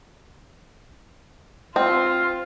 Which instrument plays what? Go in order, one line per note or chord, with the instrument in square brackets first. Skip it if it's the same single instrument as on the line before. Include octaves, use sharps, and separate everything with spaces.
[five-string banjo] C4 [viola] F4